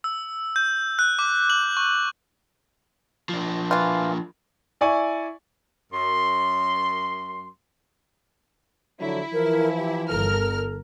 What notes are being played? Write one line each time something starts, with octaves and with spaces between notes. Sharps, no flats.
E6
G6
F#6
D6
F#7
C#6
F3 D4
E3 F4
E4 D5 G#5 C#6
F#2 C6
D3 F3 F#3 E4
E3 F3 A#4
G4
G1 A4 A#4 F6